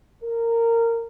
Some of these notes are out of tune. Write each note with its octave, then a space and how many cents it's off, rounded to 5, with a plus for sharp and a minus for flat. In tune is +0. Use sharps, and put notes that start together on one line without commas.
A#4 -15